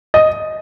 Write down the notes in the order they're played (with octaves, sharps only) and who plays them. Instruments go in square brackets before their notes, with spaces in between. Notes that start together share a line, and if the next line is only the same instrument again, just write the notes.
[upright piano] D#5